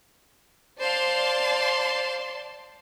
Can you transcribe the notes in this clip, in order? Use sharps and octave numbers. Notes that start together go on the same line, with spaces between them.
C5 D5 F5 A5 C6